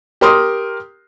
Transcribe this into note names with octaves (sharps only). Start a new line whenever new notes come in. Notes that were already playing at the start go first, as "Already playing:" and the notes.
G4 A#4 C6 D#6